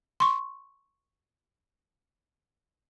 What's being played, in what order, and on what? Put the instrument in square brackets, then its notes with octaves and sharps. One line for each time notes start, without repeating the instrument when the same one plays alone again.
[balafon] C6 C#6